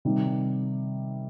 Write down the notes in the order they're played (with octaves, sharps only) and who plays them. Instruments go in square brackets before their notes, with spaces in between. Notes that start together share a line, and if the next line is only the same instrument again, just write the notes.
[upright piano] C3 D#3 G3